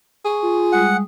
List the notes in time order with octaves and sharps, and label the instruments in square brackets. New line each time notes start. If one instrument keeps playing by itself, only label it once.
[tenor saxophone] G#4 [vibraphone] C#6
[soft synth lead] F4
[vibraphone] G3 G#3 D#6 [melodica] F#5